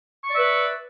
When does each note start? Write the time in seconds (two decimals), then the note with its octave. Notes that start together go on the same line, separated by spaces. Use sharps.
0.23 C#6
0.28 D5
0.32 E5
0.37 B4